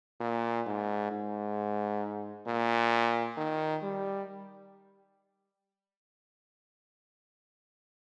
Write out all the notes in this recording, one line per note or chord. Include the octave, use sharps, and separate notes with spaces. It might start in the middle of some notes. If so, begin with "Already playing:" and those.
A#2
G#2
G#2
A#2
D#3
G3